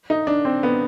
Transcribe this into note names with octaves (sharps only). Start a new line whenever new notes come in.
D#4
D4
C4
B3